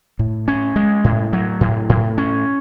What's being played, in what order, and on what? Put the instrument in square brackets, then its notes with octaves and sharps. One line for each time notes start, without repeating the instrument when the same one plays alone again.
[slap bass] A2
C#4
G#3
A2
F#3
A2
A2
C#4